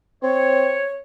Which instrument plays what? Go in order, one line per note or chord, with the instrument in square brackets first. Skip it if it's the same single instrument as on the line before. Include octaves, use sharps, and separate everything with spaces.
[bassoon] C4 [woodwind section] C#5